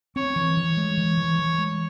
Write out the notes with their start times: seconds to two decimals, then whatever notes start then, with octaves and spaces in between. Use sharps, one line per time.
0.16 C4 C#5
0.36 E3
0.57 E3
0.77 G#3
0.97 E3
1.17 E3
1.39 E3
1.58 G#3